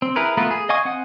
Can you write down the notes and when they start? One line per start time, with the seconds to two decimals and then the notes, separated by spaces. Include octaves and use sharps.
0.02 C4
0.16 E4 G#4 A#4 B4
0.37 A3 B3 F4 A#4 B4
0.51 G#4
0.69 D#5 F5 G#5 C#6 D#6
0.85 C4 F#5 G#5